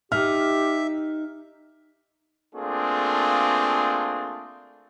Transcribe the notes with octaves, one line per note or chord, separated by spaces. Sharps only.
D#4 G4 E5 F6
A3 A#3 C4 D4 F4 G#4